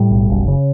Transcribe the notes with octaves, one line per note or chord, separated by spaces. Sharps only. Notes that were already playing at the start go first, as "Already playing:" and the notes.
Already playing: A2 G3
B1
F#1
C#3